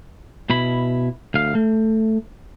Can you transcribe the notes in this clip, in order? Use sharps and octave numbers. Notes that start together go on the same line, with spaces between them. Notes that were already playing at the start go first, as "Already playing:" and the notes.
B2 E4 B5
D2 F5
A3